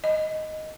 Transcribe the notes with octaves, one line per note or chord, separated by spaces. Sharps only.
D#5